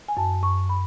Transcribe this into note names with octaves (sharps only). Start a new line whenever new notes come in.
G#5
F#2 A5
F#2 C#6
B5